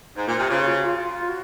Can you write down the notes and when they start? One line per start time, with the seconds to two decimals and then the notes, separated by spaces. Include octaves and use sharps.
0.17 G#2
0.28 A#2
0.38 C3
0.50 C#3 F4
0.67 F#4
0.78 F#4
0.85 F4
1.02 F4
1.28 F#4